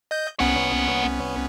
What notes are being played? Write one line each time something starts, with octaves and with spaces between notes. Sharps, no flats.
D#5 G6
C2 A#3 B3 C#4 F#5